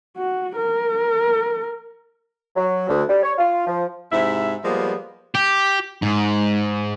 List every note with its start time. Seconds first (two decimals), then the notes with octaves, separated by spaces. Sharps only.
0.17 F#4
0.56 A#4
2.56 F#3
2.89 D2
3.09 G3
3.23 C#5
3.38 F4
3.67 F3
4.12 G#2 C3 E4 E5
4.64 F3 G3 G#3 A#3 B3
5.35 G4
6.02 G#2